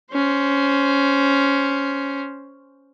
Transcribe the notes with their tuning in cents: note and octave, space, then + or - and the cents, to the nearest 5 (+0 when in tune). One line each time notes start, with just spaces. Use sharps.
C#4 +10 C5 +0